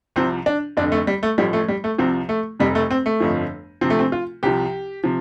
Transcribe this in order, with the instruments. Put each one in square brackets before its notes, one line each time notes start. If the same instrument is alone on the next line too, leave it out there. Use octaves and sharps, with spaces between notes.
[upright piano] C2 C3 F3 C4
D4
F1 F2 D3 D4
A3
G3
A3
A1 A2 F3 G3
A3
G3
A3
C2 C3 F3 C4
A3
F1 F2 C3 G3
A3
C4
A3
G1 F2 F3
D2 C3 F3 C4
A3
C4
F4
C2 C3 F3 G4
C3 F3